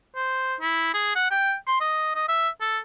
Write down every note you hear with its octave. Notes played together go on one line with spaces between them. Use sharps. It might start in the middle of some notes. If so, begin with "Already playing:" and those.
C5
E4
G#4
F#5
G5
C6
D#5
D#5
E5
A4